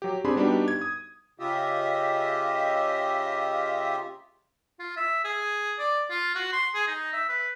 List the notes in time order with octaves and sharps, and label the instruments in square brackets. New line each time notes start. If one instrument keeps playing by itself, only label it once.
[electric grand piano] F#3 G4
C4 D4 G4 G#4 B5 C6
G3 B3 D4 D#4 F#4 G4
G#6
D#6
[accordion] C#3 F4 G4 D#5 E5
[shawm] F4
E5
G#4
D5
F4
F#4
C6
G#4
D#4
E5
B4